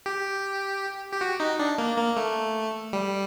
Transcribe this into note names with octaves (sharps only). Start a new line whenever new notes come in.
G4
G4
F#4
D#4
D4
A#3
A#3
A3
G3